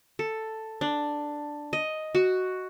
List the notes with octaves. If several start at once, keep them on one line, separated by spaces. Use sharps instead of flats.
A4
D4
D#5
F#4